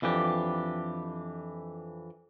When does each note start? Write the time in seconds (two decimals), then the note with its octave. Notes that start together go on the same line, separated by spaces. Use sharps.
0.02 F2 E3 D4 G4